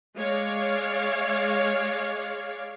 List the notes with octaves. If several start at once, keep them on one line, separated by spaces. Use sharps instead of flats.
G#3 C#5 D5 F5